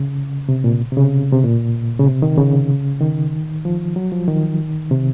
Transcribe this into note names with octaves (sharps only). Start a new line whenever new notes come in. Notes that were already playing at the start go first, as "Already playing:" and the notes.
Already playing: C#3
C3
A#2
C3
C#3
C3
A#2
C#3
C3
D#3
C#3
D#3
F3
F#3
F3
D#3
C3